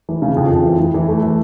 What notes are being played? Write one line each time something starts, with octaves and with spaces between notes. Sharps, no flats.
E3
C#3
F2
F2
E3
E3
E3
A3
E3